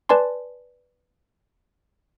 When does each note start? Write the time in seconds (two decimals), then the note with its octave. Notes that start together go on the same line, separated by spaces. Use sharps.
0.09 B4 D5 G#5 A5 C6